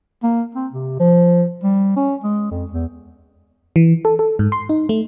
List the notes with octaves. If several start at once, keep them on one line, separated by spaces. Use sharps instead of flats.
A#3
C4
C3
F3
G3
C#4
G#3
F2
E2
E3
A4
A4
G#2
C6
D#4
A3